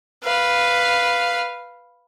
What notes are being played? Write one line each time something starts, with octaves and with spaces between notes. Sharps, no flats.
B4 F5